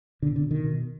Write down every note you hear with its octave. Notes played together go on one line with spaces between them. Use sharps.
B2 D3
D3
B2
D#3
B2